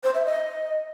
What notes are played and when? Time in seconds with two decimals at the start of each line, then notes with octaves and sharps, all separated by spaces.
0.04 C5
0.14 E5
0.25 D#5